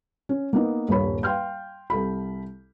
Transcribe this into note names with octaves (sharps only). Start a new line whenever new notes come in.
C#4
A#3 B3 D#4
D#1 G2 A#3 C#5 B5
F5 G5 C6 F6 G6
C2 A4 B5